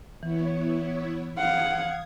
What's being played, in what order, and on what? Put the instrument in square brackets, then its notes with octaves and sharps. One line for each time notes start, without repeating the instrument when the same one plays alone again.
[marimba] E3 [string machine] B3 E4 C#5
[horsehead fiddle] F5 F#5 [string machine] D#6 G#6